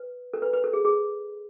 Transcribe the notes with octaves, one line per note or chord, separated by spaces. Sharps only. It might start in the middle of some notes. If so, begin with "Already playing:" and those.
Already playing: B4
A4
B4
B4
A4
G#4
G#4